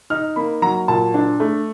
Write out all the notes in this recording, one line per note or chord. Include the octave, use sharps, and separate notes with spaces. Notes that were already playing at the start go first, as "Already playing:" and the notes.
D#4 F6
A#3 B5
F#3 A#5
A#2 A5
D4
A3